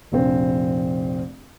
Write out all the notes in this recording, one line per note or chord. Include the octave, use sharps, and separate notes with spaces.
F1 A#1 C4